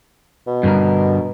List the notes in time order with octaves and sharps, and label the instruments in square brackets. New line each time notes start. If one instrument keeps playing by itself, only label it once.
[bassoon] B2
[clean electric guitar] G2 D3 A#4